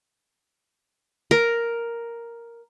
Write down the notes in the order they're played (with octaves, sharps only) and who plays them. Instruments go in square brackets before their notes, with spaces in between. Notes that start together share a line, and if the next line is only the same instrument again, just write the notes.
[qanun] A#4